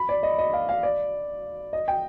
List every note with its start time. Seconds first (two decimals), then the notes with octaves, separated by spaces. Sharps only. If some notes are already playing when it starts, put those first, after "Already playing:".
Already playing: B5
0.09 D5
0.23 D#5
0.38 D#5
0.53 F5
0.69 F5
0.83 D5
1.73 D#5
1.88 G5